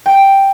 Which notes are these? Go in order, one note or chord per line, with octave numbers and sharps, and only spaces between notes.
G5